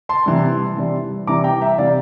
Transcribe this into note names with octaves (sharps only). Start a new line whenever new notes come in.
A5 C6
C3 E3 G3
C3 E3 G3
C3 E3 G3 A#5 D6
G5 A#5
E5 G5
C3 E3 G3 D5 F5